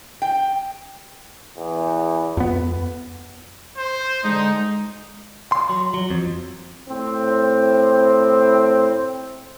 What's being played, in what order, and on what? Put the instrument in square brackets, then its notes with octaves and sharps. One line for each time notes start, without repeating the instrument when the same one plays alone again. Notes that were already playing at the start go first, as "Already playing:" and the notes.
[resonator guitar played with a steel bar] G5
[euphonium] E2
[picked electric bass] F2 B3
[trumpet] C5
[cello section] D3 G#3 [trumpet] D#4
[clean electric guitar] C6
F#3
F#3
F2
[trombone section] A2 C4